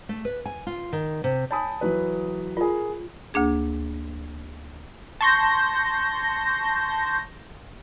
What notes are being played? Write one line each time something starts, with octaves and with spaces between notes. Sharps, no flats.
A3
B4
G#5
F4
D#3
C3
C#5 G#5 A5 B5 D#6
E3 F#3 B4
F4 G#4 A#4
D2 A#3 D4 G#4
A5 C6 C#6 G6 A#6